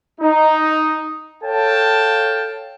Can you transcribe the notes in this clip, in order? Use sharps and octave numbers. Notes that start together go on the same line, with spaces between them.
D#4
A4 C#5 F5 G5 A5